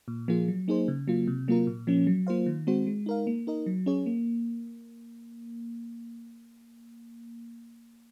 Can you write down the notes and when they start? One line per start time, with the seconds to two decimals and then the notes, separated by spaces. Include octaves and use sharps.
0.08 A#2
0.28 F3 A#3 F4 G#4
0.48 F#3
0.68 A#3 D#4 G#4 C5
0.88 C#3
1.08 F#3 A#3 F4
1.27 C3
1.48 F#3 A#3 F4 A#4
1.67 A#2
1.87 F3 A#3 C#4
2.07 F#3
2.27 A#3 F4 C5 F5
2.46 D#3
2.67 G#3 C4 F#4 C5
2.87 G#3
3.06 D#4 A#4 F5
3.27 A#3
3.47 D#4 A#4 D#5
3.66 F#3
3.86 C#4 G#4 C#5
4.06 A#3